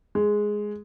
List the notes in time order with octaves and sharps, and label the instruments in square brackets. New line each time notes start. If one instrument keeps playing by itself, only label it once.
[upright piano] G#3